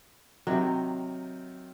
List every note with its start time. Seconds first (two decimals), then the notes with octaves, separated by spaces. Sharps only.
0.47 C3 D#3 F#3